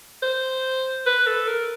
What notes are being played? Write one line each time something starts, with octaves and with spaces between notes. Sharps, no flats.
C5
B4
A4
A#4